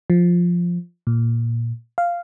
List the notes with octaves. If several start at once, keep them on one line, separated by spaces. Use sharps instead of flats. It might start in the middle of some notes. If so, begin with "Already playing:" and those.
F3
A#2
F5